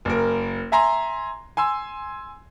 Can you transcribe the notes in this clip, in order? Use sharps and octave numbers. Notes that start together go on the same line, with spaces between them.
F#1 A#4
E5 G#5 A#5 C6
G#5 C6 E6